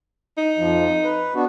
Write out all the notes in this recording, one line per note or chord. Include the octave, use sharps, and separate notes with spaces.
D#4
F2 F3
B4
B3 D4 F#4